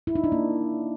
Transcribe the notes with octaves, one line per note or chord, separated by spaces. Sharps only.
E4
D#4
D4
A#3